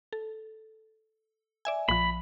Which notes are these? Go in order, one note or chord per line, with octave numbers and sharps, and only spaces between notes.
A4
D5 E5 G#5
A#1 F3 B5